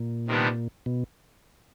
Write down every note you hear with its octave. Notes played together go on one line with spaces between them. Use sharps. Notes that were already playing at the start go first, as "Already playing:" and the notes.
Already playing: A#2
C3 D#3 G3 B3 D4
B2